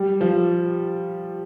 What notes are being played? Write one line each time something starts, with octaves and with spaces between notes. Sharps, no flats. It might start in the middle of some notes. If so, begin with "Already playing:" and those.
Already playing: G3
F3